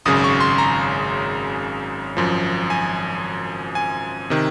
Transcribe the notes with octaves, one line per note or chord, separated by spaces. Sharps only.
G#1 F#2 C#3 D#6
C#6
C6
A#5
G#1 F#2 F3
G#5
G#5
C3 D#3